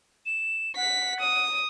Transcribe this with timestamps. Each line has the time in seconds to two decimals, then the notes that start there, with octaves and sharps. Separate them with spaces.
0.26 E7
0.76 F#5 B6
1.20 D#6